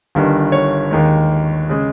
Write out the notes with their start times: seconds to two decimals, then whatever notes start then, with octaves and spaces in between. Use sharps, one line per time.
0.15 G1 G2 D#3
0.52 C#5
0.91 D#2 D#3 G#3
1.69 C#3 G#3